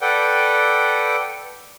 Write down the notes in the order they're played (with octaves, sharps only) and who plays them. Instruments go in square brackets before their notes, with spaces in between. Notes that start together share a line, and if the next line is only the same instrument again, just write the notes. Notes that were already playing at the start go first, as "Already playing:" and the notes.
[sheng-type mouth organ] A4 B4 D5 F#5 G5